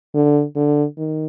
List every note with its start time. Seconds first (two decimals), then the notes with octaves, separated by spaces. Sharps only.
0.15 D3
0.56 D3
0.98 D#3